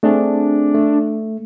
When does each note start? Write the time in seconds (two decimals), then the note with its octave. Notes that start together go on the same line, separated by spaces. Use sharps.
0.03 A3 C4 D4 G#4
0.74 A3